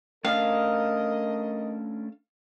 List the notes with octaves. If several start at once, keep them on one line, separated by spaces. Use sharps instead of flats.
A3 C#4 D4 A#4 D#5 F5